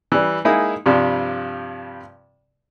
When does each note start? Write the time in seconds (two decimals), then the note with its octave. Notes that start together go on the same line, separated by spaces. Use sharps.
0.12 E3 G3
0.45 G#3 A#3 D#4 E4 G#4 D#6
0.86 G2 C3 F3 G3